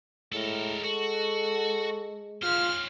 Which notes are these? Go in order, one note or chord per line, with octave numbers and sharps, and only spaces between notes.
A2 G#3 A4 A#4
F#4 A4
C#4 F4 C5 F6